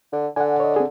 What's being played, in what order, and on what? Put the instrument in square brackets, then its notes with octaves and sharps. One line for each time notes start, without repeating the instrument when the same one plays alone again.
[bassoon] D3
[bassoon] D3 [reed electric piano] F#5 G#5
[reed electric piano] C#5 D#5
C4 G#4